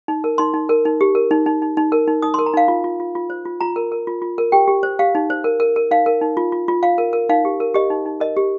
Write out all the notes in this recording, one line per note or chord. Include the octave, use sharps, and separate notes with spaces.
D#4
A#4
D#4 C6
D#4
A#4
D#4
G4
A#4
D#4
D#4
D#4
D#4
A#4
D#4
D#4 D#6
A#4 C6
A#5
D#4 F5
F4
F4
F4
F4
C5
F4
F4 A#5
A#4
A#4
F4
F4
A#4
G4 G5
G4
C5
G4 F5
D#4
C5
A#4
A#4
A#4
D#4 F5
A#4
D#4
F4
F4
F4
F4 F5
A#4
A#4
D#4 F5
G4
A#4
G4 D#5
D#4
D#4
A#4 D#5
G4